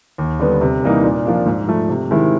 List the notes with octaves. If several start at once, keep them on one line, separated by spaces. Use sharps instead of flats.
D#2
D3 G3 B3
C3
E3 G3 A#3 D#4
A#2
F3 A#3 D4
G#2
F3 A3
C3
D#3 G#3 C4 E4